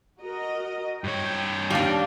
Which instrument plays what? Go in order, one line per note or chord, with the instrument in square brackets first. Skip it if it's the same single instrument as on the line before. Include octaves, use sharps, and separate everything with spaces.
[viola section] F#4 A#4 D#5
[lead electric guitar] G2 C#5 [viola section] G5
[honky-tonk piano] D#2 F5 F7 [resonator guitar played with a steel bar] G3 D4